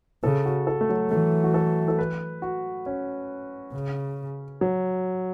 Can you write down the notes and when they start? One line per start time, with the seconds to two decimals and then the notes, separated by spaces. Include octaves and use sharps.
0.24 C#3 A4
0.45 F#4
0.67 A4
0.81 A3
0.89 F#3
1.11 E3 A3
1.44 F#4
1.54 A4
1.88 A4
1.98 B4
2.42 F#4
2.86 C#4
3.74 C#3
4.61 F#3